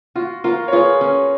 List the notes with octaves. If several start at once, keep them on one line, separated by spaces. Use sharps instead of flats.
F4 F#4
F4 F#4 A#4
C#5
F4 G#4 B4
C#4